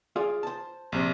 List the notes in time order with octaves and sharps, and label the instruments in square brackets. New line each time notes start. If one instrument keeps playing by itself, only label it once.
[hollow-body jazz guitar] F4 G#4 D5
C5 A5
[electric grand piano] A#1 C3